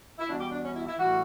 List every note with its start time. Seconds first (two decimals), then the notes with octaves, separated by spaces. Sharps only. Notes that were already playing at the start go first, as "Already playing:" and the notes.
0.19 E4
0.28 E2 B2 G3 D4
0.39 G4
0.52 D4
0.64 C#4
0.75 E4
0.87 E4
0.99 A2 E3 G3 F#4